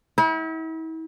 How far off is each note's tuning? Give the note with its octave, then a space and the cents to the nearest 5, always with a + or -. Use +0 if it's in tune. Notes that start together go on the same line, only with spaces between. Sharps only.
E4 -40 F#5 +25